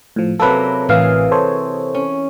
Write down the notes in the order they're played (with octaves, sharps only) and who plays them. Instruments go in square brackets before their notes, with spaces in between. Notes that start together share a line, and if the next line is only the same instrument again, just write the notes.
[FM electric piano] A2 F3
[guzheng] C3 F#3 A#3 [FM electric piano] A4 B4
[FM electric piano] A1 F5 [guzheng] E3 G#4
[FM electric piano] A4 C5 C#5
[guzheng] C#4